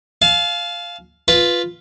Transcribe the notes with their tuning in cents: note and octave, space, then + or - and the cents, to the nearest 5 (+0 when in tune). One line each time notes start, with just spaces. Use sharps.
F5 +0 A5 -45
F4 +0 B4 +0